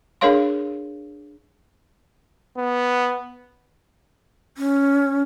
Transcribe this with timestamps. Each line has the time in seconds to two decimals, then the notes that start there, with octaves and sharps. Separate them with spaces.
0.21 D4 G#4 A#4 C#5 F5 C6
2.57 B3
4.58 C#4